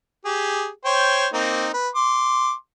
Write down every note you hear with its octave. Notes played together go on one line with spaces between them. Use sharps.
G4 G#4
C5 C#5 G5
A#3 C4 D#4
B4
C6 D6